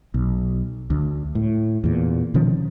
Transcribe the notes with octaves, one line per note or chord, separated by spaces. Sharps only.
B1
D2
A2
E2 A#2
B2 D#3 F3 C#4